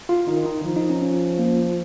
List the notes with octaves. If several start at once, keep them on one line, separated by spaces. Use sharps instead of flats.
F4
D#3 D#4
D#4
F3
D#4
C#4
C#4
A#3